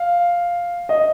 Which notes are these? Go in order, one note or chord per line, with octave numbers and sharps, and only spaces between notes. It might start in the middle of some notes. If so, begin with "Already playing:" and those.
Already playing: F5
D#5